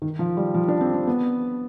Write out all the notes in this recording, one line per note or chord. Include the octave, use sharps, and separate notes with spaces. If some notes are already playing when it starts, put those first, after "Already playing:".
D#3
F3
G3
F3
D4
C4
C4
B3